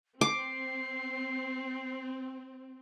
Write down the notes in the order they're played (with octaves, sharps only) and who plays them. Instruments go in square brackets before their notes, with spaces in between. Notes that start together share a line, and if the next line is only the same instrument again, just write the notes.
[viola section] C4 [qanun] D6 [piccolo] C7